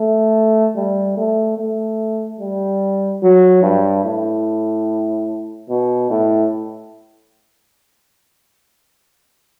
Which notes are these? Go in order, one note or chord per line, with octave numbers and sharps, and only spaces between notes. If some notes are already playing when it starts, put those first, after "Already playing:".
Already playing: A3
G3
A3
A3
G3
F#3
G2
A2
B2
A2